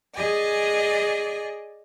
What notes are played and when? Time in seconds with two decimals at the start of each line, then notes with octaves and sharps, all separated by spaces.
0.15 G#4 D5 D#5 G#5